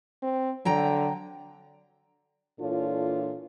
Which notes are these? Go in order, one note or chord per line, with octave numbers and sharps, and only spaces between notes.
C4
D3 F#3 G5 A#5
A#2 E3 D4 F4 A4 C#5